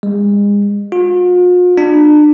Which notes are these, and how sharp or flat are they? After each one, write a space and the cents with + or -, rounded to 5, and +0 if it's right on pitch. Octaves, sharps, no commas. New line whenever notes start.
G#3 -35
F4 +45
D4 +35